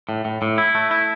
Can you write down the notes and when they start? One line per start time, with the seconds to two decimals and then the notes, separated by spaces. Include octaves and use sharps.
0.09 A2
0.25 A2
0.42 A2
0.58 E4
0.75 A3
0.91 E4